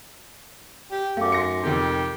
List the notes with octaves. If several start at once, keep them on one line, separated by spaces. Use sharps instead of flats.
G4
F#2 A3 F5 D6
D#4 F#4 C6 A#6 C#7
F2 C3 D#3 G4